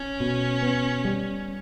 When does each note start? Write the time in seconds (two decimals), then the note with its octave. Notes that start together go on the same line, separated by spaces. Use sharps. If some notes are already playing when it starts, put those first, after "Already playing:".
Already playing: C#4
0.20 B2
0.62 B3
1.05 G3